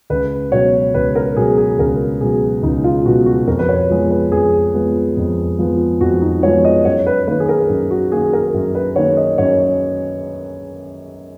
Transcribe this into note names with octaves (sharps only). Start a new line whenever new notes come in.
C#2 B4
B2 F#3 C#5
C#2 B4
A#4
B2 F#3 G#4
G#4
C#2 A#4
B2 F#3 G#4
C#2 D#4
F4
B2 F#3 F#4
F#4
F2 A#4
B4
C#5
F3 G#3 B3
B4
F2 G#4
F3 G#3 B3
F2
F3 G#3 B3
F2 F#4
D#4
F3 G#3 B3 C#5
D#5
F#2 C#5
B4
D#3 A#3 B4
G#4
A#4
F#2
F#4
D#3 A#3 G#4
A#4
F#2
B4
D#3 A#3 C#5
D#5
F#2 C#5